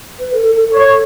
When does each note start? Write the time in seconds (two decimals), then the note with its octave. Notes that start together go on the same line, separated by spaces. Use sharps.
0.19 B4
0.33 A4
0.46 A4
0.59 A4
0.73 C#5